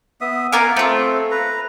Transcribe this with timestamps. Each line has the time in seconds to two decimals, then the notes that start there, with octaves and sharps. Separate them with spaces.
0.21 B3 E5 D#6
0.52 B3 A#4 F5 G#5 D6
0.76 A3 C4 F4
1.31 B4 A#5